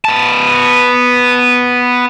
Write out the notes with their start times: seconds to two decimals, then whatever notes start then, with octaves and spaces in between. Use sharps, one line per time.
0.05 B3 A5